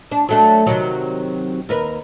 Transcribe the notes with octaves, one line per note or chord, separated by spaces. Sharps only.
D4
F#3 A3 D4
C3 D#3 F#3
D#2 A#4 B4